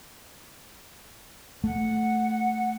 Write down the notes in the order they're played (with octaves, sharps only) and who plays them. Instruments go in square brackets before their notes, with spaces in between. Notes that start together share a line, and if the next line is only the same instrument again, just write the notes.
[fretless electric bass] A3 [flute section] F#5